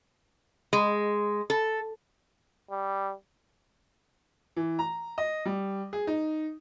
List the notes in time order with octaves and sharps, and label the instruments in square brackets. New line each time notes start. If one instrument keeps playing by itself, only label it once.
[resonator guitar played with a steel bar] G#3
A4
[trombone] G3
[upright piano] E3
A#5
D#5
G3
G#4
D#4